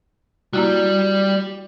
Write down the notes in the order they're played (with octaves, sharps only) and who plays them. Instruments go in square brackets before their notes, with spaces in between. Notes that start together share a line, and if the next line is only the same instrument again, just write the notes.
[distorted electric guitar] G3 [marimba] A#3 E4 F#4